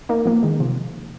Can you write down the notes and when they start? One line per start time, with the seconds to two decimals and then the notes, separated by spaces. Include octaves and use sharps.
0.09 A#3 D#4
0.26 F3 A#3
0.43 D#3 G#3
0.60 C3 F3